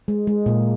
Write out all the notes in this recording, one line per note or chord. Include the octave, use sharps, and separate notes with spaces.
G#3
G#3
A#2 A#3